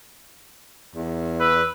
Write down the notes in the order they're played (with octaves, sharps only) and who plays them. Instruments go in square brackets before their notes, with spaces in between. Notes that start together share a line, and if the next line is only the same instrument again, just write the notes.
[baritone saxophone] E2
[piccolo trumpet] B4 [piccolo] E6